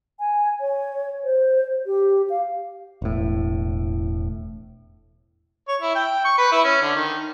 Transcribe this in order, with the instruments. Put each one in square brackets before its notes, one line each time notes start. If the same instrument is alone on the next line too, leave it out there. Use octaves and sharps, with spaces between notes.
[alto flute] G#5
C#5
C5
G4
F5
[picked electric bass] E1 A2
[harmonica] C#5
E4
G5
C#6
B4
E4
C#4
D3
D#3